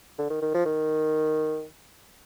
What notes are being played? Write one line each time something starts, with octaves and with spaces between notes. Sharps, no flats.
D3
D#3
D#3
F3
D#3